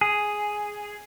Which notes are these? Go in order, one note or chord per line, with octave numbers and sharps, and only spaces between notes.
G#4